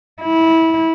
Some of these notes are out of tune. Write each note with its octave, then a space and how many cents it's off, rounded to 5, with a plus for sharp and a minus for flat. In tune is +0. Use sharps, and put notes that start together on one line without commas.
E4 -20